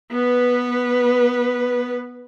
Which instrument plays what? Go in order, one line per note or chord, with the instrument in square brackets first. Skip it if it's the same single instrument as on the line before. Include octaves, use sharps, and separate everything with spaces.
[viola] B3 B4